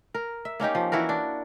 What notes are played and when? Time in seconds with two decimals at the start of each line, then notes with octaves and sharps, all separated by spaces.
0.14 A#4
0.45 E5
0.60 A#3 C#4 D#4 G4
0.75 F3
0.92 E3 E4 F#4 A#4
1.09 D4